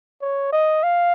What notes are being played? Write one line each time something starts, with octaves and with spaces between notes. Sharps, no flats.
C#5
D#5
F5